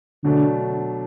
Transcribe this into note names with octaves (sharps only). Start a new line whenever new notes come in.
B2 D3 F#3 A3 D4